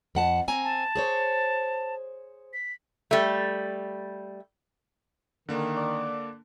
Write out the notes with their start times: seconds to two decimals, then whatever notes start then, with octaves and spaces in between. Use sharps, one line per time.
0.15 F2 F#5 A5
0.48 C4 G#5 A#5
0.64 A5
0.95 G#4 C5 C#5
2.53 B6
3.11 G3 A3
5.49 D3 D#3 A#3 D4
5.76 D5